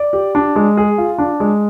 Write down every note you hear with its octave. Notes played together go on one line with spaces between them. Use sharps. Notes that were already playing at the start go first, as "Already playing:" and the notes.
Already playing: D5
G4
D4
G#3
G#4
F4
D4
G#3